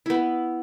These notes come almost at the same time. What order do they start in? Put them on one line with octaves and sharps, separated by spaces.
E4 B3 B4